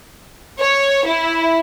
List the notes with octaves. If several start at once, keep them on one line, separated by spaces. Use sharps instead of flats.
C#5
E4